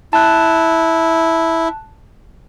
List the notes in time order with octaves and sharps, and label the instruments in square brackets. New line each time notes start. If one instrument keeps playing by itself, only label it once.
[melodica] E4 [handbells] A5 F#6